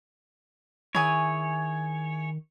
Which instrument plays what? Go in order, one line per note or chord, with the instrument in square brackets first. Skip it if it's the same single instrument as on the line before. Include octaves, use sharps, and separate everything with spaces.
[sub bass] D#3 [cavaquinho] E4 G#4 G#5 [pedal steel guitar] C#5